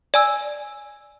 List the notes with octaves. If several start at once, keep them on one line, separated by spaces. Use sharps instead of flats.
D5 G#5 E6